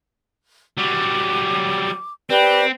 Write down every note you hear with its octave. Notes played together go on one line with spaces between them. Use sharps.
F#3 G3 D6
C4 G4 B4 D5